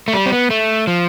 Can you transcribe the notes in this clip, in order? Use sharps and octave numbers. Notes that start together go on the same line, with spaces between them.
A3
G3
C4
B3
A3
F3